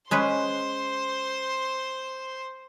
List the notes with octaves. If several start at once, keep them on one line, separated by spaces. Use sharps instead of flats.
G#3 C#4 B4 C5 C6